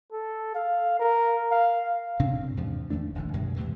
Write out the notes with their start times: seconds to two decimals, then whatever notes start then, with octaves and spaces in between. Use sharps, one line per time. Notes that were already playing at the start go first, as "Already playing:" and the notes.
0.12 A4
0.54 F5
1.00 A#4
1.51 F5
2.19 A2 C3 C4 D4
2.57 E2 G#2 C3 F3
2.90 E2 D#3 A3 D4
3.15 D#1 A#1 D#3 E3
3.33 F#2 B2 G3 G#3
3.56 E2 A2 C3 E3